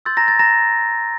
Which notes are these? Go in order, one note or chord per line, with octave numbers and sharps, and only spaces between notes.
C6 E6 G6 A6
A#5 A#6
A6
A#5 A#6